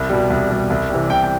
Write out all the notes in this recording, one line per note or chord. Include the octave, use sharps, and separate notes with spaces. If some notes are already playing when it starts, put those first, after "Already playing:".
Already playing: C2
B2 G3
C2
B2 G3
C2
C3 E3 G3
C2 G5
G5